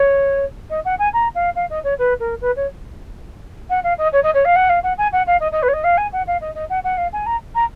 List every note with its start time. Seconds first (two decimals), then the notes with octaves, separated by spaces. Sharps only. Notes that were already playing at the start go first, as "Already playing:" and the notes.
Already playing: C#5
0.70 D#5
0.85 F#5
0.99 G#5
1.13 A#5
1.35 F5
1.56 F5
1.70 D#5
1.84 C#5
1.99 B4
2.20 A#4
2.41 B4
2.56 C#5
3.70 F#5
3.84 F5
3.98 D#5
4.13 C#5
4.23 D#5
4.34 C#5
4.45 F5
4.56 F#5
4.69 F5
4.83 F#5
4.98 G#5
5.13 F#5
5.27 F5
5.40 D#5
5.52 D#5
5.63 B4
5.68 C#5
5.73 D#5
5.84 F5
5.97 G#5
6.13 F#5
6.27 F5
6.41 D#5
6.55 D#5
6.70 F#5
6.84 F#5
6.97 F5
7.13 G#5
7.26 A#5
7.55 A#5